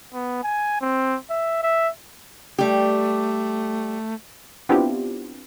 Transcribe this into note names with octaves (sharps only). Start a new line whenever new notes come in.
B3
G#5
C4
E5
E5
G3 A3 G4
B3 C4 D4 E4 F4 G4